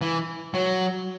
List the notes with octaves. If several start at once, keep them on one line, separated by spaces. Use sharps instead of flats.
E3
F#3